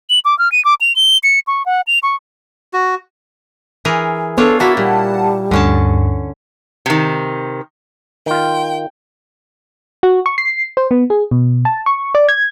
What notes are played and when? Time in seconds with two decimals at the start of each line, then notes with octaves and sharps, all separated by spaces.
0.10 F#7
0.25 D6
0.39 F6
0.52 D#7
0.65 D6
0.81 F7
0.96 G7
1.23 C#7
1.47 C#6
1.66 F#5
1.87 F7
2.03 C#6
2.73 F#4
3.85 E3 G#4 A#4
4.38 B3 D4 F4 A4 C#5
4.60 A#3 E4 F#4 F#5 A5
4.77 A#2 G3
5.51 D2 G2 D3 C#4 A5
6.86 C3 D#3
8.26 D#3 F4 G5
10.03 F#4
10.26 C#6
10.38 C7
10.77 C5
10.91 B3
11.10 G#4
11.31 B2
11.65 A5
11.86 C#6
12.15 D5
12.29 G#6